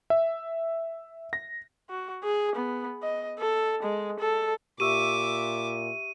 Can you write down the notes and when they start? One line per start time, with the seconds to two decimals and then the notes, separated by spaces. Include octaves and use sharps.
0.10 E5
1.33 A#6
1.90 F#4
2.23 G#4
2.55 B3
3.03 D#5
3.39 A4
3.82 G#3
4.20 A4
4.80 A#2 G4 E5 C#6 D6 E6 D#7